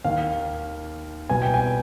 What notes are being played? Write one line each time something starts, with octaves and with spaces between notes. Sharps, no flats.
D#2 D#3 F5
C2 B2 G#5
G5
G#5